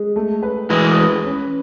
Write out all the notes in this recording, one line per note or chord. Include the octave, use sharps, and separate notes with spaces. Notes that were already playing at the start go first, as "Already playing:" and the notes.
Already playing: G#3
A3
B4
E3 G#3 B4
B4
C#4